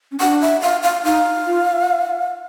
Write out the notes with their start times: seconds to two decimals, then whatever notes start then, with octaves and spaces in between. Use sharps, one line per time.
0.12 C#4
0.20 D4 F#5
0.42 E5
0.62 F5
0.83 F5
1.05 D#4 F5
1.47 F4